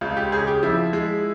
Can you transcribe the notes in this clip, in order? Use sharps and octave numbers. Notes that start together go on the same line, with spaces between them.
C#2 F4
G4
C#3 G#4
G4
F3 E4
G#3